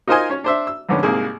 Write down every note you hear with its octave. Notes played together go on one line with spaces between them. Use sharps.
D#4 F4 A#4 C5 D#5 G#5
C#4 C#5
D4 C5 E5
E6
F2 G#2 D3 B3 C#4
C2 G#2 A#3 G#4